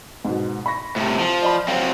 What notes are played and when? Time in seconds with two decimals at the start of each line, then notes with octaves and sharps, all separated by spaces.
0.25 G#2 B2
0.66 B5 C#6 A#6
0.96 A2 C3
1.19 F3
1.42 D5 D#5 B5
1.68 F#3 C4 F5